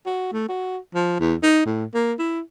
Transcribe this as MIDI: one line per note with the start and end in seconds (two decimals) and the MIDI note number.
0.06 0.32 66
0.32 0.46 57
0.49 0.78 66
0.95 1.16 53
1.20 1.35 40
1.43 1.63 63
1.66 1.85 45
1.94 2.13 58
2.19 2.41 64